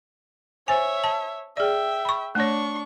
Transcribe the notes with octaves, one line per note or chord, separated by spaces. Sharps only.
C5 C#5 E5 G#5
A5
G#4 D5 E5 G5
B5 C#6
A3 D4 C#5 C#6